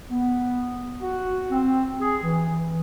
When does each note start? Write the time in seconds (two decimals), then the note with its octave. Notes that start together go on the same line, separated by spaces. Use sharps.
0.10 B3
1.00 F#4
1.50 C4
2.00 G#4
2.23 E3